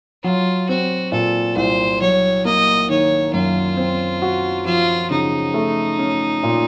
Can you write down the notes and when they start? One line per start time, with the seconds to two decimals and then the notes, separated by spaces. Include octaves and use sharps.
0.24 F#3 F4
0.69 C4 F#4
1.12 A#2 A4
1.56 C2 C5
2.01 F#3 C#5
2.45 A#3 D#5
2.89 D#3 C#5
3.34 F#2 F4
3.77 C4
4.22 F#4
4.66 F3 F4
5.11 C#3 D#4
5.54 A3
5.99 C#4
6.43 A#2